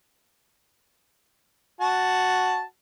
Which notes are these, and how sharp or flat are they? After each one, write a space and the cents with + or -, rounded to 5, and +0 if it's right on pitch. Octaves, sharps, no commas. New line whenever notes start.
F#4 +0 A5 +0